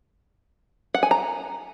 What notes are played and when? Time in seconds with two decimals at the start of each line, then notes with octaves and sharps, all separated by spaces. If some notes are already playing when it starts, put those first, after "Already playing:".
0.95 F#5
1.03 G#5
1.11 A#5